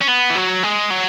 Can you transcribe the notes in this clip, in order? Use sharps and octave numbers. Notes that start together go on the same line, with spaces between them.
C#4
B3
E3
F#3
G#3
F#3